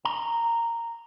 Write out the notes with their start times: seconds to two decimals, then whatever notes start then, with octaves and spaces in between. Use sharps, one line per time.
0.05 A#5